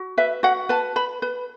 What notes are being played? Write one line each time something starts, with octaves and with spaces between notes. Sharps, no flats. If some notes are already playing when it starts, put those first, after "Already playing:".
Already playing: F#4
B4 E5
F#4 F#5
B4 A5
B4 B5
B4